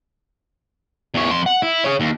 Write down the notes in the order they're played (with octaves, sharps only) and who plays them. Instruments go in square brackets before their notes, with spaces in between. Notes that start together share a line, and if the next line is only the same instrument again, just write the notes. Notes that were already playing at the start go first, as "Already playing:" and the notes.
[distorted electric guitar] E2 C#5
F2 C6
F#5
E4
G#4 C#5
D#2